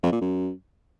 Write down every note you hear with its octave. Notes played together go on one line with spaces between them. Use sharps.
F2
A#2
F#2